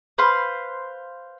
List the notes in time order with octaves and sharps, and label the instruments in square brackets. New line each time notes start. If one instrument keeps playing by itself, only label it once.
[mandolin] B4 C5 F5 C6